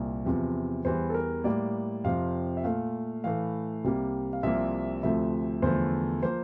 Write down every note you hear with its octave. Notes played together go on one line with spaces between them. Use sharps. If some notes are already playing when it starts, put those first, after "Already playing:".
Already playing: C2 A#2 A#3
E2 C3 F3
E2 E3 G3 C5
A4
A#4
A2 G3 A#3 D5
F2 C3 F3 F5
E5
A#2 A3 F5
A2 E3 A3 F5
C2 C3 G3 A#3
F5
C2 C3 F3 A#3 E5
D2 C3 F3 A3 E5
E2 D3 F3 A3 C5
F3 A#3 C5